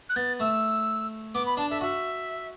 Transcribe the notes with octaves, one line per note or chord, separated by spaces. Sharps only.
F#6
B3 A6
A3 E6
B3 D6
B5
D4 A5
A4 E5
F#4 E5